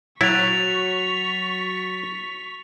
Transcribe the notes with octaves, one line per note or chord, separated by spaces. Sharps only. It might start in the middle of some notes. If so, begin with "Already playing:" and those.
F#3 E4 C#6 A6 B6 F7